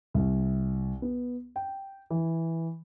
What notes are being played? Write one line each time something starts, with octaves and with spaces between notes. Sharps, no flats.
C2
B3
G5
E3